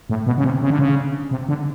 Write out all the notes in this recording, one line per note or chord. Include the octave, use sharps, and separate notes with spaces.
A2
B2
C#3
C3
C#3
D3
C#3
C3
D3